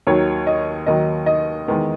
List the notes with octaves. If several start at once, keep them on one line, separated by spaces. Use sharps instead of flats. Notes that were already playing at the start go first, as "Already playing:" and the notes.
D#2 D#3 F#3 C#5
D#5
D#2 D#3 F#3 D#5
D#5
E2 D#3 G#3